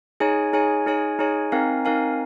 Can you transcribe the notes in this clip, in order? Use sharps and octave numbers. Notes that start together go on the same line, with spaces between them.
D#4 G#4 C#5 G#5
D#4 G#4 C#5 G#5
D#4 G#4 C#5 G#5
D#4 G#4 C#5 G#5
C4 D#4 A#4 F5 G#5
C4 D#4 A#4 F5 G#5